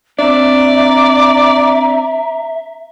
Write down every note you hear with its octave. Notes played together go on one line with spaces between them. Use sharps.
C4 D4 D5 E5 A#5